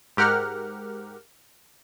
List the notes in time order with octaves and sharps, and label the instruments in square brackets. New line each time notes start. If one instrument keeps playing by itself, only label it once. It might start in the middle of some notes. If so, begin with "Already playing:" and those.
[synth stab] G#2 G4 A#4 F#5 F6